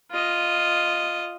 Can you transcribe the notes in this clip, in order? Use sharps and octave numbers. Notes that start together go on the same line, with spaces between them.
F4 D#5